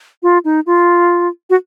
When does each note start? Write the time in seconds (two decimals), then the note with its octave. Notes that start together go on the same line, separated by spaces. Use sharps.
0.23 F4
0.45 D#4
0.66 F4
1.50 F#4